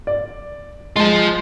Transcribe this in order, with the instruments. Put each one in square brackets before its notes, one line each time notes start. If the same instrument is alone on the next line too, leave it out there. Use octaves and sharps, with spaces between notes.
[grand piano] D5
[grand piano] G#3 [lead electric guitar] F4 A5